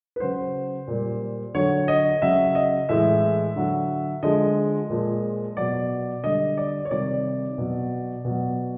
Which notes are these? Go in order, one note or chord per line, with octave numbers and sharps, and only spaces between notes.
B4
C#3 F#3 C5
A#2 G3
D3 F#3 C#5
D#5
C#3 F#3 E5
D#5
A2 E3 G#3 E5
D3 F#3
D3 F3 G#3 D#5
A#2 F3 G#3
B2 F#3 D5
D3 G3 D#5
D5
C#5
C3 D#3 G3 D5
B2 F#3
B2 F#3